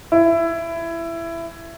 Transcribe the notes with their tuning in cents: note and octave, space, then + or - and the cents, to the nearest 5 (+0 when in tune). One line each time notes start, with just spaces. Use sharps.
E4 +20